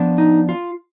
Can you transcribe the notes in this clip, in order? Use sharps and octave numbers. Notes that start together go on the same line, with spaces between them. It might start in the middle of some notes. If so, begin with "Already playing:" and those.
Already playing: F3 B3 D4
D#4
F4